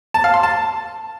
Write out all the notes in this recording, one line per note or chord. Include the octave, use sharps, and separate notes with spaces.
A5
F5
C6
A5